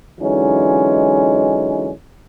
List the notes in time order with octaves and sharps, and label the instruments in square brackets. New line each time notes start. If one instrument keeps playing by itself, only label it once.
[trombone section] D3 E3 F#3 G#3 C#4 D#4